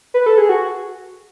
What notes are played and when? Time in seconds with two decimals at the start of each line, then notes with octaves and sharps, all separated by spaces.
0.14 B4
0.26 A4
0.38 G#4
0.49 F#4